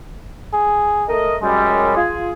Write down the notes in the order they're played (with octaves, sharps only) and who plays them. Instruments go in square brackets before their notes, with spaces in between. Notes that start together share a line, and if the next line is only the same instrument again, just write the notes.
[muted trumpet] G#4
[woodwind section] A3 A#4 D#5
[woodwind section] F#2 G3 [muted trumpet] G#3
[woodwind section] F4 G#4